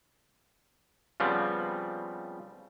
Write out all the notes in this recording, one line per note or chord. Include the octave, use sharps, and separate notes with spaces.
C#3 F3 G3 B3 C4